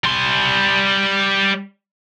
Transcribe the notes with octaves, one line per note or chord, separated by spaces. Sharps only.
G3 C6